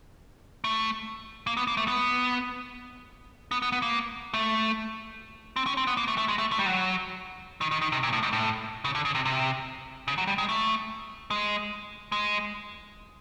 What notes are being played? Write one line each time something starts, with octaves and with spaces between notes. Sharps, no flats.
A3
A#3
B3
A#3
A3
B3
B3
B3
B3
A#3
A3
C4
C#4
C4
B3
A#3
A3
A3
G#3
A3
A3
G3
F#3
D#3
D#3
D#3
C3
A#2
A2
G#2
A2
C#3
D3
C#3
C3
C3
C#3
F#3
G3
G#3
A3
G#3
G#3